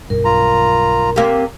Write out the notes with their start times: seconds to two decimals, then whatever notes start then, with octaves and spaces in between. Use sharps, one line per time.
0.10 B1 G2 A#4
0.25 F4 A#5
1.16 C3 A#3